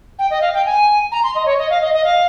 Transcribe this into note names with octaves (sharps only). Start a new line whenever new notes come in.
G5
D#5
F5
G5
G#5
A#5
C6
D#5
C#5
D#5
F5
D#5
D#5
F5